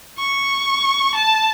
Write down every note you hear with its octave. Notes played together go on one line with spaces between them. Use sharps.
C#6
A5